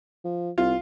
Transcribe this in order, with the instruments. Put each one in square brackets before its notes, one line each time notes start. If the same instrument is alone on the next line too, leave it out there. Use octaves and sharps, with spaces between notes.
[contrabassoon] F3
[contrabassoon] C2 [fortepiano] F4